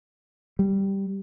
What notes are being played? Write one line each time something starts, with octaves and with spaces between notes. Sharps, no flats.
G3